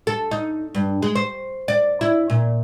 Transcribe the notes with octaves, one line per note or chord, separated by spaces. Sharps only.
A4
D#4
G2
G#3
C5
D5
E4
A#2